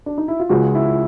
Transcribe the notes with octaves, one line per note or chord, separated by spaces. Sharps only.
D4
D#4
E4
F4
C#2 C#3 F3 G#3 F#4
E4